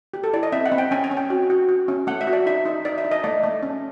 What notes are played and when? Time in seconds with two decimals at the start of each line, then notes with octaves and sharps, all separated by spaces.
0.14 G4
0.24 A4
0.33 E4 D5
0.43 D#5
0.52 C4 E5
0.66 F#5
0.72 C4
0.78 G5
0.91 C#4 G#5
1.04 G#5
1.11 C#4
1.17 G5
1.30 F#4
1.50 F#4
1.69 F#4
1.88 C#4
2.07 A3 F#5
2.21 E5
2.27 F#4
2.33 D5
2.46 D#4 E5
2.65 D#4
2.85 D#4 D5
2.98 E5
3.05 D#4
3.11 D#5
3.24 A3 D5
3.43 A3
3.63 C#4